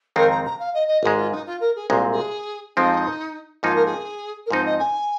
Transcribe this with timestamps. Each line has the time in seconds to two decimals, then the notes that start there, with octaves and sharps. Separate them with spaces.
0.16 F2 D#3 G#3 C4 D#4 A#4
0.30 A#5
0.45 A#5
0.59 F5
0.74 D#5
0.88 D#5
1.03 G#1 G#2 G#3 G#4
1.17 F4
1.32 D#4
1.46 F4
1.60 A#4
1.75 G#4
1.90 C2 A#2 G#3 C4
2.12 G#4
2.76 F2 F3 G#3 C4 D#4
3.63 G#2 F3 A#3 D#4 F4
3.75 A#4
3.85 G#4
4.46 A#4
4.51 G#2 F3 C4 D#4 C5
4.65 D#5
4.79 G#5